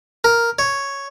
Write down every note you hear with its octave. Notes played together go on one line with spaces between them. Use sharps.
A#4
C#5